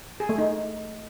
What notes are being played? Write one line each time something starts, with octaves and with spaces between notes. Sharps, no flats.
G#4
A3
D#4